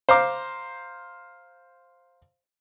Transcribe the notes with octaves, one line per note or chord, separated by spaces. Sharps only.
C5 F5 A#5 D6